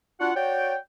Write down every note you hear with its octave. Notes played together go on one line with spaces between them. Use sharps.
D4 F4 F#4 F#5
F#4 C#5 D5 G5